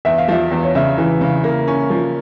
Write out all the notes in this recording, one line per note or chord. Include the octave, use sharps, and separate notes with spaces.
E2 E5
F5
F3 E5
E2
C#5
C#3 E5
E3
C#3
A#3
C#4
F3